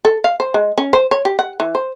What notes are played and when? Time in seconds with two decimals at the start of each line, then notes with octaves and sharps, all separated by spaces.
0.05 A4
0.24 F5
0.40 C5
0.54 G#3
0.78 C#4
0.93 C5
1.11 C#5
1.25 G4
1.39 F#5
1.60 E3
1.75 C5